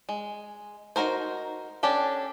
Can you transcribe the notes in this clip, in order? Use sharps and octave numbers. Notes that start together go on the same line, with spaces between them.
G#3
D#4 E4 F#4 A#4 C5
C#4 D4 G4 A4